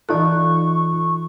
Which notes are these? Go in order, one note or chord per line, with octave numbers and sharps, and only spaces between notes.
E3 D#4 F4 A4 D5 C#6 F#6